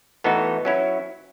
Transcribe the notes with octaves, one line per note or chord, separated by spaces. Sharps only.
A2 E3 B3 D#4 F#4
F#3 C#4 E4